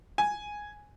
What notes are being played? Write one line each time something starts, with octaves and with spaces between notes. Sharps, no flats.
G#5